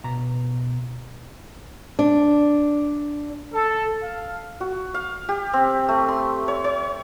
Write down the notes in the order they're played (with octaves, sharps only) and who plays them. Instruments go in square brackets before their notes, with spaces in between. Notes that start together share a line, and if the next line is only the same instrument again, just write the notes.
[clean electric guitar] B2 A#5
[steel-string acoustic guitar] D4
[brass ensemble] A4
F5
[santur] F#4
F5
G4
C4
A3
C6
C#5
C#5